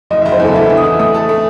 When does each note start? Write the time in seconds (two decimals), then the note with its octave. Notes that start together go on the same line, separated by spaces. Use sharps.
0.11 F#1 D#5
0.22 E5
0.25 F#1
0.32 C5
0.40 E2 A4
0.54 E3 E5
0.66 E5
0.70 E3
0.77 D#6
0.84 E3
0.99 A3 D#6
1.14 A4
1.29 A3